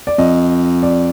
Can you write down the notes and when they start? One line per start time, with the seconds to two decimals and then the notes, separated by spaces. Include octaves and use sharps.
0.07 D5
0.18 F2 D#5
0.83 D5